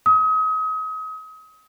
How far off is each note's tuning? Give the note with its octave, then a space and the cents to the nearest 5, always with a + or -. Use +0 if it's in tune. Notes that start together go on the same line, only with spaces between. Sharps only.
D#6 +35